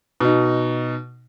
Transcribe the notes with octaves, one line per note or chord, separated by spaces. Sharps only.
B2 D#4